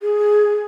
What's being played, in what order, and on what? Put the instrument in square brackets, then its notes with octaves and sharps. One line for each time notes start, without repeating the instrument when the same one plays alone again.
[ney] G#4